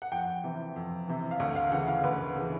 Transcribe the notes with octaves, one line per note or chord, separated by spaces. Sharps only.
F#5
F2 G5
C3 E3
F2
C3 E3
F5
D2 F#5
F5
C#3 E3 F#5
F5
D2 B4
C#3 E3